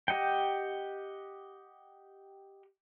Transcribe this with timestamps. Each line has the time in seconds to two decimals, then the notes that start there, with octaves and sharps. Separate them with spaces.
0.08 G4 D#5 F#5 G5